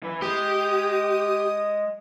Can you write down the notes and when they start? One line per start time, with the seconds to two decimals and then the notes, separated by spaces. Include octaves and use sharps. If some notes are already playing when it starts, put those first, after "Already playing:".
0.03 E3 B4
0.22 G#3 G4 D#6